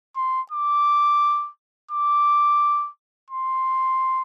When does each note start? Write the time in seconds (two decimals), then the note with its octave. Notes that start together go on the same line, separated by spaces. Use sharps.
0.16 C6
0.52 D6
1.91 D6
3.31 C6